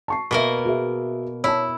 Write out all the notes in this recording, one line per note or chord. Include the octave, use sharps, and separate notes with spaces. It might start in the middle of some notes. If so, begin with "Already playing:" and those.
A5 C#6 C7
B2 A#3 A#4 E5 C#6
F#4 G#4 E5
E4 C#5 A5